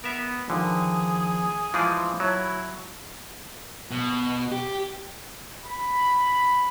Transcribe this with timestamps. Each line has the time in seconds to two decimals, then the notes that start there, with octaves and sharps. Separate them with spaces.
0.04 B3 A#4 E5
0.50 G2 D3 D#3 F3 G#4
1.74 E3 F3 G#3 E4 F4 G#4
2.20 F#3 E4 C#5 A5 B5
3.91 B2
4.52 G4
5.66 B5